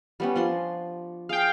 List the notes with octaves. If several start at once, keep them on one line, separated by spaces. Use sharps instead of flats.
G3 B3 C#4
F3 D4 C6
G#4 F5 G5